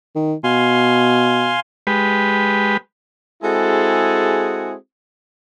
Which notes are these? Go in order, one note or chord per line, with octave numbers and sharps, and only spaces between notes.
D#3
B2 F5 G#5 C6
G#3 G4 B4
G#3 C4 E4 F#4 G#4 A4